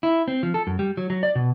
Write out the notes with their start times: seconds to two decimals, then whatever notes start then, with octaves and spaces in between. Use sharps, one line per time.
0.03 E4
0.28 C4
0.43 F3
0.54 A4
0.67 F#2
0.79 G3
0.97 F#3
1.10 F#3
1.23 D5
1.35 B2